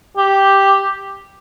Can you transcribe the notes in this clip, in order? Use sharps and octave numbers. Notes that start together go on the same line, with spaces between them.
G4